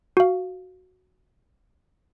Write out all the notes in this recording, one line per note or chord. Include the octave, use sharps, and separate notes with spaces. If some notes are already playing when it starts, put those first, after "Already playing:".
F#4 F5